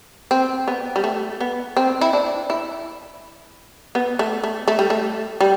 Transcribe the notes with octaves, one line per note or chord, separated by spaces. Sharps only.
C4
B3
G3
A3
B3
C4
E4
D4
E4
B3
A3
A3
A3
G3
A3
G3